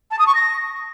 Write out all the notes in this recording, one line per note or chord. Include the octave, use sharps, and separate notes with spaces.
A5
D#6
C#6
A#6